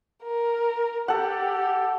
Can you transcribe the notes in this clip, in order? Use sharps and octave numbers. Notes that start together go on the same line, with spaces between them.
A#4
G4 A4 F#5